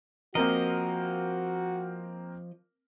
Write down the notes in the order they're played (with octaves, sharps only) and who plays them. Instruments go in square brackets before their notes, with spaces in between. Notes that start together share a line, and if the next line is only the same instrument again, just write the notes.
[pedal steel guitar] F3 D#5 [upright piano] A#3 C4 A#4 [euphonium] F#4